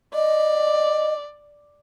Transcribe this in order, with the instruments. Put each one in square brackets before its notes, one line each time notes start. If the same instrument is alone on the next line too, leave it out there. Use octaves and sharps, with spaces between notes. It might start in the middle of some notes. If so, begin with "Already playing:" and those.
[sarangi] D5 [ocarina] D#5